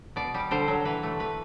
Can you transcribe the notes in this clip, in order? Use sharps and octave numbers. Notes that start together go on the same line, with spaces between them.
B2 D5
G3
D3 C5
F#3
E3 B4
A3
E3 B4